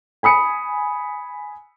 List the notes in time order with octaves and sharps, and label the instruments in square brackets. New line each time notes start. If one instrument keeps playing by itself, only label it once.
[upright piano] G#5 B5 D#6 C#7